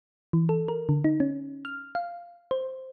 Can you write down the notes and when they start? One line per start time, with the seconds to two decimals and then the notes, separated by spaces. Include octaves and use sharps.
0.33 E3
0.49 A4
0.68 A#4
0.89 D3
1.04 D#4
1.20 C#4
1.65 F6
1.95 F5
2.51 C5